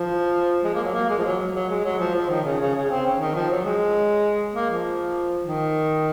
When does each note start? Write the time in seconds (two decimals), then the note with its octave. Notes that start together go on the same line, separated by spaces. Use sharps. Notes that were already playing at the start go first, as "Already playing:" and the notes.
Already playing: F3
0.64 G#3
0.75 A#3
0.84 F#3
0.94 A#3
1.09 G#3
1.18 F3
1.24 F#3
1.54 F#3
1.70 G#3
1.84 F#3
2.00 F3
2.15 F3
2.30 D#3
2.45 C#3
2.60 C#3
2.76 C#3
2.90 C4
3.06 C#4
3.20 D#3
3.35 F3
3.51 F#3
3.65 G#3
4.55 A#3
4.70 F3
5.45 D#3